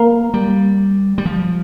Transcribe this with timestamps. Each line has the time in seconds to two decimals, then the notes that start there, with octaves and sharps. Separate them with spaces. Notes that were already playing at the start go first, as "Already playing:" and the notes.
Already playing: A#3 A#4 F5 A#5
0.34 G3
1.18 G3
1.26 F3